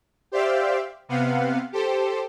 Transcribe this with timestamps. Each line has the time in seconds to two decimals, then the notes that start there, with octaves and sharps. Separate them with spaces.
0.32 G4 C5 D5 E5 F5 G5
1.09 C3 B3 F5 F#5
1.72 G4 A4 C5